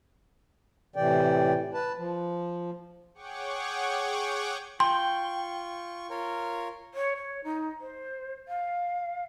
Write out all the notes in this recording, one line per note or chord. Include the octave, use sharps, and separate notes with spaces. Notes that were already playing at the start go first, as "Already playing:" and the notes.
A2 C3 E3 D5 G5
B4 A5
F3
G#4 C#5 F#5 G5 C#6 D6
F4 G5 C6 C#6
F4 A#4 C#5
C#5
C#5
D#4
C5
F5